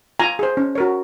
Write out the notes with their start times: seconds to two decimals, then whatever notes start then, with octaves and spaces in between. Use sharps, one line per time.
0.20 F4 G#5 A#5
0.39 G#4 C5
0.57 C#4
0.75 F#4 A#4 C#5